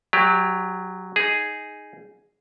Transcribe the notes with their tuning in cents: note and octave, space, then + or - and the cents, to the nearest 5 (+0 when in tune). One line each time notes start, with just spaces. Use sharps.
F#3 +0 G4 +25 D5 +0
D#4 +0 G#4 +0